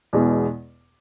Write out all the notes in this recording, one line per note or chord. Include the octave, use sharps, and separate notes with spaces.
E2 B2 G#3